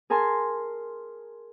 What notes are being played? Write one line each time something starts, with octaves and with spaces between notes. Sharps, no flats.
G#4 A#4 G#5 A5 C6